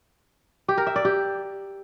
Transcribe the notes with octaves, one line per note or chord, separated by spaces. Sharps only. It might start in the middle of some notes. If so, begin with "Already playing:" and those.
G4
A#4
E5
D5
G4